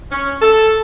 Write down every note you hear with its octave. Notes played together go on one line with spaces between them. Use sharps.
C#4
A4